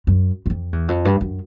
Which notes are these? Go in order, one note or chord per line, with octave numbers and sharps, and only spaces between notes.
F#2
E2
F2
E2
F2
G2
F#2